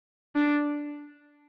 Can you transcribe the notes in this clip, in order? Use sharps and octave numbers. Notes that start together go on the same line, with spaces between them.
D4